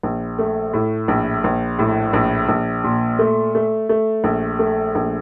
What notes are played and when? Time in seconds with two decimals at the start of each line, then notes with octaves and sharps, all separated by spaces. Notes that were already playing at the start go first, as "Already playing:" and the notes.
0.03 A#1
0.39 A3
0.74 A2
1.08 A#1
1.44 A#1
1.79 A2
2.13 A#1
2.49 A#1
2.84 A#2
3.19 A3
3.55 A3
3.89 A3
4.24 A#1
4.59 A3
4.95 A#1